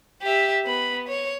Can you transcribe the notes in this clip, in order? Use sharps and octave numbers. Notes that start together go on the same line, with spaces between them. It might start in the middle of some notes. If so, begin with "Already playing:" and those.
G4 E5
B3 B5
C#5